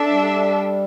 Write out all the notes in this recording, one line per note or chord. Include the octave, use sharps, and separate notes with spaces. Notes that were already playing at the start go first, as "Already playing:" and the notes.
Already playing: D4 A4 E5
G3